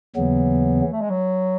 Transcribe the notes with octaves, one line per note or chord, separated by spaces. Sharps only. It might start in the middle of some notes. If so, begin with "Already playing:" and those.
D#2 C#3 E3 F#3 B3
A3
G#3
F#3